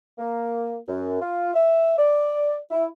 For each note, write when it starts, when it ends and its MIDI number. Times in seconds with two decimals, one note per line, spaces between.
0.18 0.76 58
0.87 1.18 42
1.21 1.50 65
1.54 1.94 76
1.98 2.56 74
2.71 2.85 64